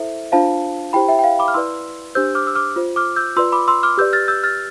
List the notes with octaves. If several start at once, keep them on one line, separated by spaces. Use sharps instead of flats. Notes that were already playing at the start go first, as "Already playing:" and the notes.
Already playing: E4 A4 C5 E5
D4 F4 C5 F5 A5
E4 G4 C5 G5 B5
E5 G5
G5
F5
B5 D6
F6
E4 B4 D5 C6 E6
D4 G4 C5 E6 G6
D6 F6
E6
D6 F6
F4 C5
D6 F6
E6 G6
F4 B4 D5 C6 E6
B5 D6
C6 E6
D6 F6
G4 B4 D5 E6 G6
F6 A6
E6 G6
F6 A6